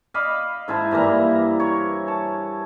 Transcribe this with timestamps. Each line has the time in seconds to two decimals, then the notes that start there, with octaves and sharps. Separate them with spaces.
0.14 D#5 F5 B5 D6
0.68 G#2 E4 C5 A5
0.91 G2 E3 A#3 A#5
1.60 C#5
2.08 A5